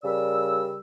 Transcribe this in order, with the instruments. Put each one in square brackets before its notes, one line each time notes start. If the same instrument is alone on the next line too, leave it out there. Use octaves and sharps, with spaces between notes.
[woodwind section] C#3 G3 A#4 D5 E6